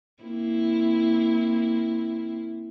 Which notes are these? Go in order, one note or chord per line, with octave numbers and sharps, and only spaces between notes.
A#3 C4 E4